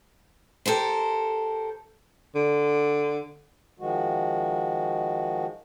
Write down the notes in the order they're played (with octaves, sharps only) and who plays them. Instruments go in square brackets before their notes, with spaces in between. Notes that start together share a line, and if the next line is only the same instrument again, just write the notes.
[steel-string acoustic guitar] G4 A4 A#4 C5
[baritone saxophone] D3
[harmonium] D#3 F3 G#3 F#4